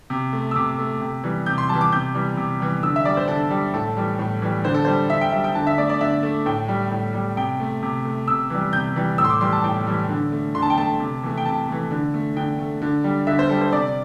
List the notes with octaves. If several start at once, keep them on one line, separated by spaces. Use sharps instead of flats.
C3
A3
E6
C3 D6
A3
C3
E3 G3
C3 G6
C6
E3 G3 A5
D6
C3 G6
E3 G3
C3
E3 G3
D3 E6
E5
G3 D5
C5
D3 A4
G3
A2 A4
E3 G3
A2
E3 G3
D3 C5
A4
G3 C5
D3 E5
G5
G3 E5
G5
D3 A5
E5
A3 D5
D5
D3 E5
A3
A2 G5
G3
A2
G3
C3 G5
A3
C3
A3
C3 E6
E3 G3
C3 G6
E3 G3
A2 E6
C6
D6
E3 G3 C6
A5
A2 G5
E3 G3
D3
A3
D3 C6
A5
G5
A3 A5
C3
E3 A3
G5
C3 A5
E3 A3
D3
A3
D3 G5
A3
D3
G3
D3 E5
C5
G3 A4
C5
C3 D5